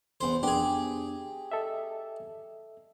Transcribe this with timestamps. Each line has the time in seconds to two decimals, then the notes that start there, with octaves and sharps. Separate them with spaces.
0.21 E2 C5
0.43 F2 B3 D4 G4 G#4
1.52 A4 D#5 E5